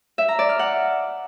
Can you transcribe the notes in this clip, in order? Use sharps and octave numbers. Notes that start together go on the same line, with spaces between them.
E5
A#5
D5
F6
F#5